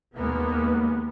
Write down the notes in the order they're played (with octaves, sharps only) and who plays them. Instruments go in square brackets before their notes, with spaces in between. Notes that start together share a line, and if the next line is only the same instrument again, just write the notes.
[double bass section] D#2 G#3 A#3 B3